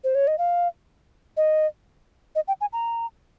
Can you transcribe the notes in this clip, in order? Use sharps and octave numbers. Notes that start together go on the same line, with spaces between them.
C5
C#5
D#5
F5
D#5
D#5
G5
G#5
A#5